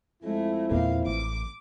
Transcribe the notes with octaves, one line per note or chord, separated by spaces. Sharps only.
F2 G#3 A3 E4
E2 A#2 A#3 F5
A1 D6